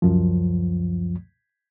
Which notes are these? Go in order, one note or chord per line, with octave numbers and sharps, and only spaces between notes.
C#2 F#2 F3